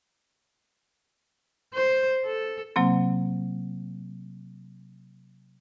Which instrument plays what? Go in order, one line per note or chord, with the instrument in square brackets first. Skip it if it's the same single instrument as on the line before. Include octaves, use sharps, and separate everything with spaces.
[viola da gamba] C5
A4
[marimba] C3 F#3 A#3 C4